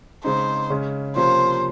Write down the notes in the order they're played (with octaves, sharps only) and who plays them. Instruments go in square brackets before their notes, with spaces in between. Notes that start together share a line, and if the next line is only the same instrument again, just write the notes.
[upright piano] C#3 G#3 C4 D#4 [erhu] C5
[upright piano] C#3 G#3 C#4
[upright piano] C3 F3 A#3 C#4 [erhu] C5